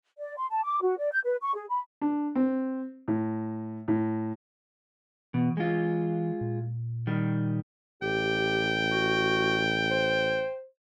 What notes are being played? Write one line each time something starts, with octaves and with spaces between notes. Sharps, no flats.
D5
C6
A5
D6
F#4
D5
G6
B4
C#6
G#4
B5
D4
C4
A2
A2
B2 E3
G#3 F4
A#2
D#3 G3
A1 G4 G5
F#4
C5